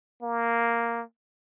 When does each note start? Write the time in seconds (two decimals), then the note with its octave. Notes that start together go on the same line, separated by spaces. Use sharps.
0.22 A#3